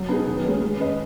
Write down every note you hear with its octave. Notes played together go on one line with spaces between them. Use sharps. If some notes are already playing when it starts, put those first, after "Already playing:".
Already playing: F#3
B3 D#4 G#4
D#3
G#3 C#4 B4
G#3
C#4 B4 D#5